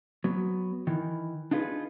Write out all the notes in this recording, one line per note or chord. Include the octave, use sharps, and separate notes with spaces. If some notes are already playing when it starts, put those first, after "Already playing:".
F#3 B3
D#3 E3
D4 D#4 F4 G#4 B4